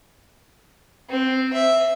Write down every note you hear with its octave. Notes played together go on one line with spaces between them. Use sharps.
C4
E5